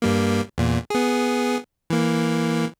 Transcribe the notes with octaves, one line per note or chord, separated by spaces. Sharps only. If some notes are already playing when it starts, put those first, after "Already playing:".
G2 G3 A#3
E2 A#2
B3 G#4
E3 A#3